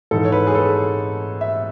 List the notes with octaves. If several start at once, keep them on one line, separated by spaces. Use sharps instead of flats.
G#2 E3 A4
C#5
B4
G#4
A4
E5